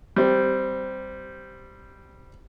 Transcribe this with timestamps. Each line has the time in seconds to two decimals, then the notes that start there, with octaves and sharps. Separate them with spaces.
0.16 G3 C4